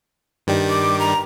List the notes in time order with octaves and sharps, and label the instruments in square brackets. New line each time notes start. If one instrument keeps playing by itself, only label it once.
[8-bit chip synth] G2 D#3 G3
[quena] D6
A#5